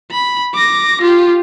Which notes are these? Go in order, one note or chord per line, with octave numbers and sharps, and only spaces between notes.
B5
D6 A#6
F4 G4